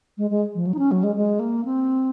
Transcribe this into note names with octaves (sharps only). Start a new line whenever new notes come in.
G#3
G#3
F3
F#3
D#4
C#4
F#3
G#3
G#3
A#3
C4